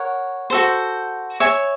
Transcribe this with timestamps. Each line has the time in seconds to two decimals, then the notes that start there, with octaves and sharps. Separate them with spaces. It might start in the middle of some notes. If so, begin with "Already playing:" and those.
Already playing: A#4 C#5 F#5
0.50 F#4 A4 C5
1.40 C#5 E5 G#5 C#6